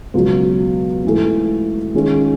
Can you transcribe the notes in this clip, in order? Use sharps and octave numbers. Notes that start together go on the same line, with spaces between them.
C#2 B2 F#3
G#2 E3 A3
D#3 G#3 C#4 F4 G#4